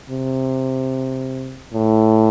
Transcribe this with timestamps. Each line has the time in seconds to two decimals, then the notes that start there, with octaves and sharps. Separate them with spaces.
0.10 C3
1.73 A2